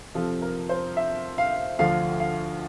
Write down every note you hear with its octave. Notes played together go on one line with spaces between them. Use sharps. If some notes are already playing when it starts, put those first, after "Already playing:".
F2 C3 F3 A4
A#4
C5
E5
F5
D2 D3 F3 F5
F5